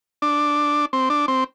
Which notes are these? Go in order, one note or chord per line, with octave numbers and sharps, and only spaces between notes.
D4
C4
D4
C4